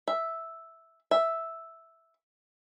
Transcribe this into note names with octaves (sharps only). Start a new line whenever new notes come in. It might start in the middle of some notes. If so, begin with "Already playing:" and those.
E5
E5